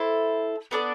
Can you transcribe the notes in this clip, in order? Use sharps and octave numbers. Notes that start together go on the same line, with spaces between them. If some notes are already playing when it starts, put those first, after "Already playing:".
Already playing: E4 A4 C5
B3 D4 A4 D5